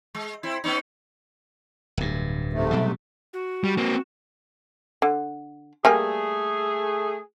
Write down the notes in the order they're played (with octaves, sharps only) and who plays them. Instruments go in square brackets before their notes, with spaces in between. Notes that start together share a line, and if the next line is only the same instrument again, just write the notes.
[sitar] G#3
C4 E4
B3 C#4 D#4
[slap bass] D1 G2
[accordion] G#2 C3 A3
[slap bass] B2 F#3 G3
[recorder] F#4
[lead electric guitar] G3
A#3 C4
[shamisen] D3
[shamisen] G3 A#3 G#5 [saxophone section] A3 G#4